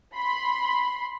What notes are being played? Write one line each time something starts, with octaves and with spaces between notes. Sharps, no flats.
B5 C6